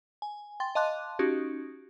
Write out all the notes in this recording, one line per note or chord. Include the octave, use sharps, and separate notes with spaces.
G#5
G5 C6 A6
D#5 F5 A5 C6 D6 F#6
C#4 D#4 F#4 G4